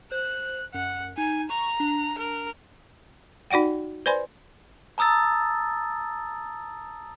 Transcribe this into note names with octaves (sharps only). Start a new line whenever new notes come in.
C5 F#6
F#2 F#5
D#4 G#5
A#5 C#6
D4
A#4
D#4 F#4 D5 F#5 G5
B4 C5 D5 G#5 B5 C6
A5 A#5 D#6 E6 A6